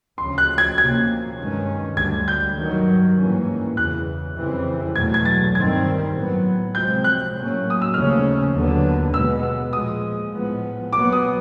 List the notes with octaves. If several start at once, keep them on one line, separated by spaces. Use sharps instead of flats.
D2 C#3 F3 C6
F#6
G#6
C3 F3 A#3 C#4 G#6
G2 D#3 G#3 C#4
D2 D3 G3 G#6
G6
G2 D#3 F#3
G#2 E3 G3 A#3 C#4
E2 C#3 E3 F#6
F2 C#3 E3 G3 C4
E2 B2 F#3 A3 G#6
G#6
A6
G2 D#3 G3 C4 G#6
A2 F#3 B3
C3 F3 G#3 C4 G6
F#6
A2 F#3 A#3 C#4
D#6
E6
D#2 C#3 F3 A3 C#4 F6
D#2 D3 F#3 B3
B2 G#3 B3 E6
E6
A#2 F3 G#3 D#6
A2 F3 G#3 B3
B2 F#3 B3 D6
D#6